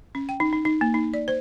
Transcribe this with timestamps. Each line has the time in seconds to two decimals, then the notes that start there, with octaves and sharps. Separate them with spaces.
0.15 C#4
0.29 G5
0.40 D#4
0.53 D#4
0.65 D#4
0.81 A#3
0.94 D#4
1.14 D5
1.28 C5